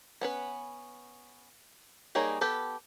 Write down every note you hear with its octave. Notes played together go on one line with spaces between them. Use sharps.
B3 C#4 B4
G3 A#3 D#4 G#4 C#5
B3 G4 A4 B4